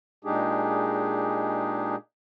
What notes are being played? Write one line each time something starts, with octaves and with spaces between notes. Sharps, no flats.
A#2 G#3 D4 D#4 G4 G#4